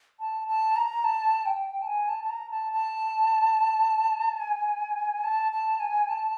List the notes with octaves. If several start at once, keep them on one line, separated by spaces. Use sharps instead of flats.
A5
A5
A#5
A5
G5
A5
G#5
A5
A5
A#5
A5
A5
G#5
A5
A5
G#5
A5